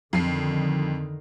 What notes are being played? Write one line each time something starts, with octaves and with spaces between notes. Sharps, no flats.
F2 D3 D#3 C7